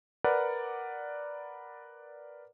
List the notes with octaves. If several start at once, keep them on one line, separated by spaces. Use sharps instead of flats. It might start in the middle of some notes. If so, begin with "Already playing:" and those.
A#4 B4 D5 F#5